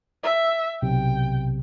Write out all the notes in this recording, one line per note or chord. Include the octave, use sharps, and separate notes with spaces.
E5
B1 C3 G5